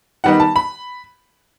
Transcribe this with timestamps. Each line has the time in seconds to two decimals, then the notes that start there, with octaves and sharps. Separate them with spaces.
0.24 D#3 G3 B3 D#4 F#5
0.40 A5
0.56 B5